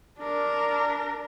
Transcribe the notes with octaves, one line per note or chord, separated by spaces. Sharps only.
D4 A#4